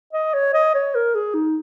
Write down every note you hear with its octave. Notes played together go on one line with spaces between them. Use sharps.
D#5
C#5
D#5
C#5
A#4
G#4
D#4